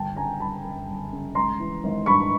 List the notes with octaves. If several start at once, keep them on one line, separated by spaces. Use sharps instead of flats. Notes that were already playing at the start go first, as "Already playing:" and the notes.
Already playing: G1 G5 A5
C#3 G#5 A#5
G1 A5 B5
F#2
G1
C#3
G#1 A#5 C6
E3
G#1
G2 B5 C#6